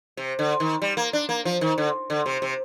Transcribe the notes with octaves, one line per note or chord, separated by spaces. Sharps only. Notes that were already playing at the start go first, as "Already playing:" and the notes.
C3
D3
D#3
G3
A#3
D4
A#3
F3
D#3
D3
D3
C3
C3